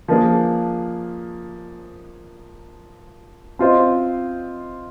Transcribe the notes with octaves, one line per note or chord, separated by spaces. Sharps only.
F3 A#3 D4 G#4
C4 F4 C5 D#5